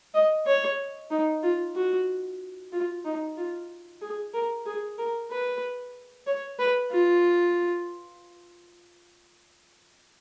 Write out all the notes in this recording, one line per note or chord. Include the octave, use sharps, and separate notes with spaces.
D#5
C#5
D#4
F4
F#4
F4
D#4
F4
G#4
A#4
G#4
A#4
B4
C#5
B4
F4